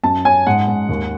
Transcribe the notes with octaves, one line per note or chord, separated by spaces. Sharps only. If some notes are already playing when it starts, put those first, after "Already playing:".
F#2 A5
C#4 G#5
G#2 F#5
G#2
D#2